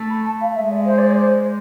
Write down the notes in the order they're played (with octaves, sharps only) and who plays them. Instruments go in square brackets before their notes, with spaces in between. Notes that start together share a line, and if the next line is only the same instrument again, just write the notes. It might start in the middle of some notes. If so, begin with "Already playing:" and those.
Already playing: [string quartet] A3
[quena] B5
A5
F5
[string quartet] G#3 [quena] E5
[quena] D5
C5
D5
C5